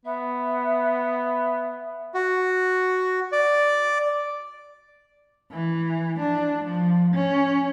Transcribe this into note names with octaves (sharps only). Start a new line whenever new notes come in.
B3 E5
F#4
D5
E3
D4
F3
C#4